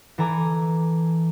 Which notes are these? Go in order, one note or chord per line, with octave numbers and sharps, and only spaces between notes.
E3 A4 G#5 A#5 D6